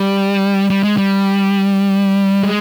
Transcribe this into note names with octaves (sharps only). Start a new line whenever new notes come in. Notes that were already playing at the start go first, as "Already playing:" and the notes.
Already playing: G3
G3
G#3
G3
G#3